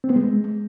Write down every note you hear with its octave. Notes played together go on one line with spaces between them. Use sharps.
C4
B3
G#3